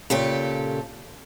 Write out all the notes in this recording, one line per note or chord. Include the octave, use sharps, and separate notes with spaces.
A#2 C#3 G4 A4